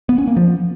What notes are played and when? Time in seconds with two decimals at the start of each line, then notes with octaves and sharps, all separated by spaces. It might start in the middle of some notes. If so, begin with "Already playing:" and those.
0.09 B3
0.18 C#4
0.27 A#3
0.37 F3